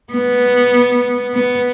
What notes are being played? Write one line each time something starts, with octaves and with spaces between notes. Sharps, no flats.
B3
B3